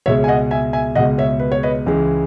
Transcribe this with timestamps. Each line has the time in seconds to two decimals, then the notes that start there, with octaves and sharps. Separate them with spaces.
0.06 C#2 B2 G#3 C#5 E5
0.24 G#5
0.28 D#5 F#5
0.51 E5 G#5
0.73 E5 G#5
0.95 C#2 B2 G#3 D#5 F#5
1.18 C#5 E5
1.39 B4
1.52 C#5
1.63 B4 D#5
1.86 C#2 C#3 E3 G#3